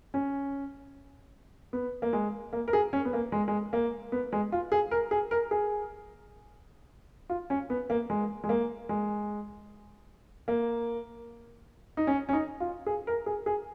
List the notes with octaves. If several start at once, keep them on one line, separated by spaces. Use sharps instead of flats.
C#4
B3
A#3
G#3
A#3
A#4
G#4
C#4
B3
A#3
G#3
G#3
A#3
B3
G#3
F4
G#4
A#4
G#4
A#4
G#4
F4
C#4
B3
A#3
G#3
G#3
A#3
G#3
A#3
D#4
C#4
C#4
D#4
F4
G#4
A#4
G#4
G#4